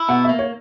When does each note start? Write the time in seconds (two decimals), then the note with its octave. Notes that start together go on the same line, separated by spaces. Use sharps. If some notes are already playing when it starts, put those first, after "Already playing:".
Already playing: E4
0.09 B2 F#5
0.24 E5
0.29 A#3
0.39 C#5